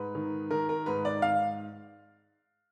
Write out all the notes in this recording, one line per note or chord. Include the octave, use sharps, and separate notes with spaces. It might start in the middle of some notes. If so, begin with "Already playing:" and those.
Already playing: G#2 B4
D#3
D#3 A#4
A#4
G#2 B4
D5
F5